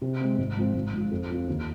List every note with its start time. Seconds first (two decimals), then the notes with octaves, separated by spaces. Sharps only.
0.02 C3
0.21 G#3 C4
0.38 G#1
0.57 G#2 F3 C4
0.74 G#1
0.94 G#2 F3
1.11 F2
1.30 F3 C4 F4
1.48 D#2